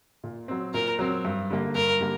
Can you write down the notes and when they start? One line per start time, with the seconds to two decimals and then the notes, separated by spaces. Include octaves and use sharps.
0.24 A#2
0.48 F#3 C4
0.74 A#2 A#4
0.99 F#3 C4
1.25 G2
1.50 D3 G3 A#3
1.75 G2 A#4
2.01 D3 G3 A#3